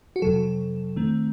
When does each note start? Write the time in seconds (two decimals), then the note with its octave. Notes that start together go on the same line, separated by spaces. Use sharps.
0.16 F#4
0.22 F2 C3 F#3 A4
0.96 D#3 A3 C4